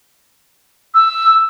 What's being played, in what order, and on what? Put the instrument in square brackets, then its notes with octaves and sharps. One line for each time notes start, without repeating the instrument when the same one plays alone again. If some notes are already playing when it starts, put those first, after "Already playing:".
[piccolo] E6